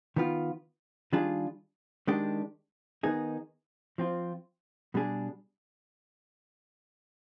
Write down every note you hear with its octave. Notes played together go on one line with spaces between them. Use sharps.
D#3 B3 F4
D#3 G3 D4 F4 G#4
D#3 G#3 D4 G4
D#3 B3 D#4 G#4
F3 C4 F4
B2 G3 D4 G#4